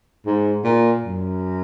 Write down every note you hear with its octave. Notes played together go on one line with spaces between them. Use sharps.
G#2
A#2
F#2